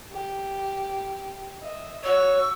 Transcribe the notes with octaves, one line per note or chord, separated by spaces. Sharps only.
G4
D#5 E5
F#4 C#5 C#6 E6